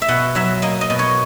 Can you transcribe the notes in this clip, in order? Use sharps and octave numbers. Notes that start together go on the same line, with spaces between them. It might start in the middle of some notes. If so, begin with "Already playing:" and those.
E5
B2 F#5
F#3 E5
A#3 D#5
D#5
B2
C#5